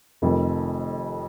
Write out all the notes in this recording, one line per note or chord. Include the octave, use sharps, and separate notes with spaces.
F1 F2 D#3